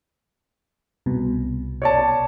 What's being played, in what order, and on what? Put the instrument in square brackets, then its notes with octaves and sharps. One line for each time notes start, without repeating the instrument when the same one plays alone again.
[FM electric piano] C2 B2
[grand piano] C#5 D5 A5